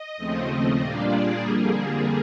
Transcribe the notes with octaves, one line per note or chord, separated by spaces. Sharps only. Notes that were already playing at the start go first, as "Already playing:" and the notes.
Already playing: D#5
D#2 C#3 F3 A3 C4
A#2 G3 A#3 D4 F4 D5
G#4
F2 D3 G3 A#3 G#4